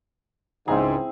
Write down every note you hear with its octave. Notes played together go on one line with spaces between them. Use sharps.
C#2 G#2 C4 E4 G#4 G#5 A#5